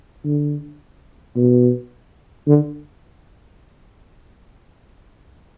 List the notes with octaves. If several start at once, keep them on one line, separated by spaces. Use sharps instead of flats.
D3
B2
D3